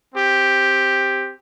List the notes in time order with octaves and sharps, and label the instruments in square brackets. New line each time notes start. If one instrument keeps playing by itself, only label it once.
[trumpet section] C4 G4